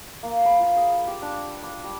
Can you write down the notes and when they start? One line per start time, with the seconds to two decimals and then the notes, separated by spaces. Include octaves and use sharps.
0.23 A#3
0.46 B5
0.59 F4
0.76 G#4
1.08 G4
1.22 D4
1.63 D6
1.84 G3